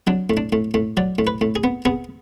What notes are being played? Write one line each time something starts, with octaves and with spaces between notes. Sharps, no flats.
F#3 D4
A2
D4
A2
A2
F#3 D5
A2
B4
A2
G#4
B3
B3 G#4